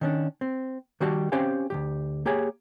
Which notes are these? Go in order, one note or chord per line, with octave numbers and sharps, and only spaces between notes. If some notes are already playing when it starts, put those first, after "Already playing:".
D#3 C#4 D4
C4
D#3 G3 F#4 G4 D5 A5
C4 C#4 G4 C5 F5 G#5
D2 D#3 G4
A#3 G4 G#4 C#5 G#5